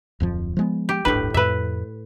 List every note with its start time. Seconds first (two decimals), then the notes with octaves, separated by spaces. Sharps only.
0.20 D1 F2 F3
0.57 F3 G#3 B3
0.89 G4
1.05 D1 G1 A2 D4 B4
1.34 F2 A2 B4 E5